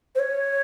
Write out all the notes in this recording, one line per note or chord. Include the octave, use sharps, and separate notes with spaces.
C5
C#5